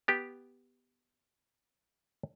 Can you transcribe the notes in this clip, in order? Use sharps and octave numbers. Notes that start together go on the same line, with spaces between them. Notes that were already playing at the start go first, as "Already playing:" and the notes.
B3 G4